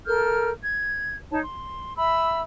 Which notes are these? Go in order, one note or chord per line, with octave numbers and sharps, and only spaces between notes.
A4 A#4 F6 G6
G#6
D#4 C#5 A5
C6
E5 B5 E6